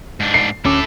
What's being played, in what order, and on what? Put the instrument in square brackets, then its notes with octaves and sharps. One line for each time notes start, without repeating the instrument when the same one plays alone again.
[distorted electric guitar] G#2 D4
[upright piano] C7
[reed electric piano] D2 C#4 D6 [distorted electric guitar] E4 A4